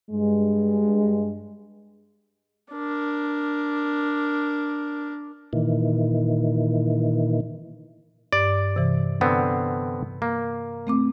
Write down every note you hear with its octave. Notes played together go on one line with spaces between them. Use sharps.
G2 G#3
D4 A#4
A#2 D#3 E3
G2 D5
C3 E3
D3 B3 C4
A#3
A3 C4 D6